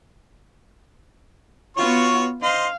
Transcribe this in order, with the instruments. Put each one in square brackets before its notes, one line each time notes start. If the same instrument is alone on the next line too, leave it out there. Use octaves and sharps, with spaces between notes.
[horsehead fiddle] B3 F4 [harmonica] F#4 C#5 C#6
[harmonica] C5 D#5 C6 [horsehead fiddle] F5